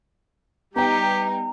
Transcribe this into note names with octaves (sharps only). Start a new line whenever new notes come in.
G3 B3 D#4 G4 G5 A#5